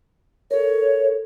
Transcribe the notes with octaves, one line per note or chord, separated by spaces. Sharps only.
A4 A#4 C#5